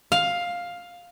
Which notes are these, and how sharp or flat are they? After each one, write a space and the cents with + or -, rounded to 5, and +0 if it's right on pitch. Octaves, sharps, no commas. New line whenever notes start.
F5 +10